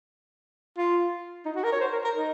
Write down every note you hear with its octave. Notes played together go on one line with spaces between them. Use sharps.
F4
D#4
F#4
A#4
C#5
C5
A#4
A#4
D#4